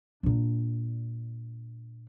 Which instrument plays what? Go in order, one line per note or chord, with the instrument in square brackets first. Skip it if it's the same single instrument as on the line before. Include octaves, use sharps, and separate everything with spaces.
[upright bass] A#2 D4